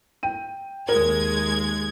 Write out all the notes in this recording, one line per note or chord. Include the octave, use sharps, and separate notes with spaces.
G5 D#7
D#2 G#3 A#4 G#6